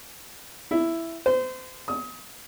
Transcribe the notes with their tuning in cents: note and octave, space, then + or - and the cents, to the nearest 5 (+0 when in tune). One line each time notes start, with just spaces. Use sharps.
E4 +5
C5 -30
D#6 +30